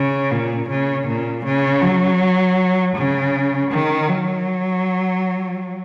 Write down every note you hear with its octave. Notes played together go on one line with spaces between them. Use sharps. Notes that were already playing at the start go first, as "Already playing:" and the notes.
Already playing: C#3
A#2
C#3
A#2
C#3
F#3
C#3
D#3
F#3